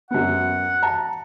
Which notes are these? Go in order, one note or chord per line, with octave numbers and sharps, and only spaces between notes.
F#2 B3 F#5
A5 A#5